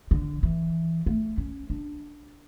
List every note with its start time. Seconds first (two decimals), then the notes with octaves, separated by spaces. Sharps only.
0.11 D3
0.43 E3
1.06 A3
1.38 C#4
1.70 D4